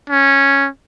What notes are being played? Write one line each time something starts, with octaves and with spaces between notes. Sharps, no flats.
C#4